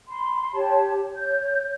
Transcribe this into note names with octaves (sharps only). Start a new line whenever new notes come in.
B5 C6
G4 C#5 A5
C#5 G6